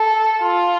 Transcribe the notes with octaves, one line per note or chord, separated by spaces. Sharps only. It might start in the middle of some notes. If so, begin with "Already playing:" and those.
Already playing: A4
F4